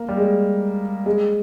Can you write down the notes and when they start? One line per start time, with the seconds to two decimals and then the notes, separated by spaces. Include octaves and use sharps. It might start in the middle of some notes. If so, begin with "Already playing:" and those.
Already playing: A#3
0.09 G3
0.17 G#3
1.06 G#3